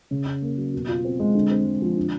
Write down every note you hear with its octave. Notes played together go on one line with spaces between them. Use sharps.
C#3
C#4
A#3
F#3
B2
F4
C4
G#3
D3
C4
G#3
F3
D3